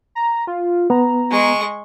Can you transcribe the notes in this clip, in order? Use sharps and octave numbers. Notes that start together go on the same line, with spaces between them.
A#5
F4
B3 A#5
G#3 C#6